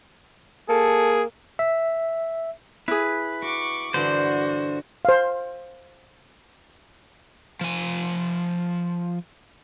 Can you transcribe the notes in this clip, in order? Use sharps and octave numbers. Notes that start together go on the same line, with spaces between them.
A#3 G#4 A4
E5
E4 G#4 B4
F#4 C#6 D6
G2 D3 E3 F#4 C5
C5 F5
F3 G#5